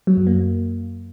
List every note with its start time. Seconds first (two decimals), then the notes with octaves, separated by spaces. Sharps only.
0.07 F#3
0.17 F#2
0.27 A#3